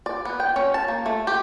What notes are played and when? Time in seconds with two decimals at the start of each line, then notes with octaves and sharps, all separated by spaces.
0.06 D5
0.25 B3
0.40 G5
0.56 C#4
0.74 A5
0.88 A#3
1.06 A3
1.27 G4